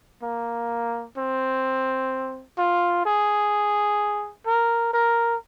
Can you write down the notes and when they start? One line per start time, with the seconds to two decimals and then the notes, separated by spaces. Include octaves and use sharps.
0.22 A#3
1.17 C4
2.58 F4
3.05 G#4
4.46 A#4
4.93 A#4